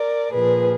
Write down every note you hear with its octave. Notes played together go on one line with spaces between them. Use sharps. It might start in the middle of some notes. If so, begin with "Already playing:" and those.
Already playing: A#4 D5
A#2 F3 G#4 B4